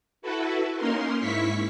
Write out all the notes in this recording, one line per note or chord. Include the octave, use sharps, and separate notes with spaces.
E4 F#4 A4 B4
A#3 C#4 D#4 A#4 C6
G#2 E4 C#6 B6